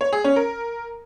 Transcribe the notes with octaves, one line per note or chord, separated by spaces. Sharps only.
C#5
G#4
C#4
A#4